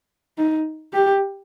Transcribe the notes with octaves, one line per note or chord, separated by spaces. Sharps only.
D#4
G4